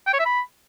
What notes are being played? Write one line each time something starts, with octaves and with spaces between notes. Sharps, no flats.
G5
C#5
E5
B5